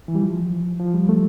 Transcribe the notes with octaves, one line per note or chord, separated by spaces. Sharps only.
E3
G3
F3
F3
G3
A3